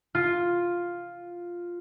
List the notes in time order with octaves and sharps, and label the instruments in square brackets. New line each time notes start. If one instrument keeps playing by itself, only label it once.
[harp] F4